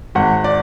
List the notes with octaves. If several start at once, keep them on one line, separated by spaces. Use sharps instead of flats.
G#1 F#5
D5